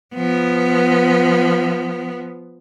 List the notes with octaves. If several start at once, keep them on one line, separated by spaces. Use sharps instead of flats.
F3 B3